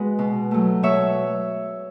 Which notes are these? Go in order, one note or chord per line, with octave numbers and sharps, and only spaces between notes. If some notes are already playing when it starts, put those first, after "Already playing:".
Already playing: G#3 B3 F#4 B4 D#5
B2
F#3 A3
B2 C#5 E5